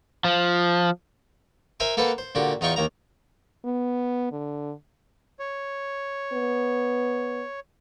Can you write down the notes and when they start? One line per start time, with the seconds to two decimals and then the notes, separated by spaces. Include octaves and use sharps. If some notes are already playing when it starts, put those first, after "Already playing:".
0.24 F3
1.80 A#4 C5 E5 G#5
1.97 A#3 A4 B4 C5 F#5
2.18 C5
2.35 A#2 D3 F#4 G4
2.61 E2 D#4 F4 G5 C#6
2.76 D#2 A#3 A#5
3.65 B3
4.32 D3
5.39 C#5
6.33 B3